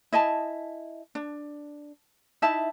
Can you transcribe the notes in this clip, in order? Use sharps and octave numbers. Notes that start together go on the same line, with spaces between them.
E4 D#5 G#5 A5
D4
D#4 E4 E5 A5